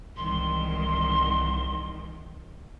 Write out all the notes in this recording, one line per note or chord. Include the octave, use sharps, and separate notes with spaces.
C2 G#2 D#3 E3 C6